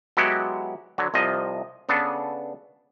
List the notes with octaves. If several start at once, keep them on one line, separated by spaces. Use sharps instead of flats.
F#3 G#3 B3 E4 F#4 G4
D3 F#3
C2 C3 F3 D#5
C#3 B3 D4 A4 B4